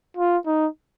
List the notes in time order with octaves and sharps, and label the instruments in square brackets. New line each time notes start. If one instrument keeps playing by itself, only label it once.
[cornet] F4
D#4